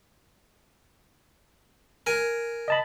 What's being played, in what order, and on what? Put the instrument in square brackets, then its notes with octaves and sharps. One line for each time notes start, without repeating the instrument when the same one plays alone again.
[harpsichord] A#4 G#5
[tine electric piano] D#5 A5 B5